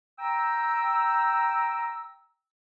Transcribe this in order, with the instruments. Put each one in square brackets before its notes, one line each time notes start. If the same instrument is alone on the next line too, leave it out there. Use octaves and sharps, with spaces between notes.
[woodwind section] G5 A#5 E6